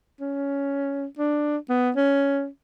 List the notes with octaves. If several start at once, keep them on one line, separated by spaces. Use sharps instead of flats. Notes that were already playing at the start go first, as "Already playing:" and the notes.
C#4
D4
B3
C#4